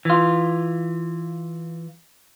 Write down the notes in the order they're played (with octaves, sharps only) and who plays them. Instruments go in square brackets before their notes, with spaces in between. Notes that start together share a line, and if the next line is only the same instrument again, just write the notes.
[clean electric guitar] E3 F4